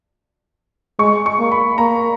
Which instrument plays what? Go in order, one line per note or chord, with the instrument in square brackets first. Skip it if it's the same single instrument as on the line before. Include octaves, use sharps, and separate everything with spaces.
[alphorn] G#3 [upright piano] C#6
[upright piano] C#6
[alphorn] A#3
[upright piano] B5
[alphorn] A#3 [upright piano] A#5